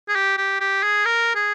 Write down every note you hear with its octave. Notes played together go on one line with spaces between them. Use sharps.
G#4
G4
G4
G4
G#4
A#4
G#4